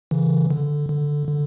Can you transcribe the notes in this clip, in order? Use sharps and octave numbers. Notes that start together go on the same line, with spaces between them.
C#3 E3
D3
D3
D3